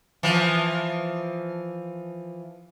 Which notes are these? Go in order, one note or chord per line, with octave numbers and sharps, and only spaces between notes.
E3 F3